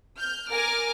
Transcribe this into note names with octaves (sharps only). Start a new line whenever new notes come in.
F6 G6
A#4 G#5 D6 F6